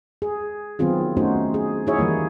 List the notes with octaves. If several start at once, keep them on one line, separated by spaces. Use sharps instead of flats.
G#4
D#3 F#3 B3 C4 F4 G#4
A3 C#4 D#4 F#4 C5
G#4
D#4 E4 F#4 G#4 C#5 E5
D#3 E3 G3 A#3